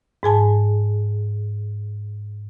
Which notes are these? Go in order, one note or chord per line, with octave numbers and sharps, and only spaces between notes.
G#2 G#4 G#5 A5